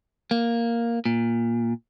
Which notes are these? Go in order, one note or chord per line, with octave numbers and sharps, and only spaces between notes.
A#3
A#2